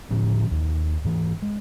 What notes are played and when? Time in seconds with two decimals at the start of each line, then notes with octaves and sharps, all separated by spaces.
0.11 A2 D3 F3 C#4
0.51 D#2
1.05 G#2 E3
1.42 G#3